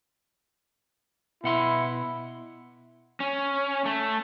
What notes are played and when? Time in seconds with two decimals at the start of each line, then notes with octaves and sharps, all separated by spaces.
1.44 B2 E4 F#5 C6
3.20 C#4
3.85 A3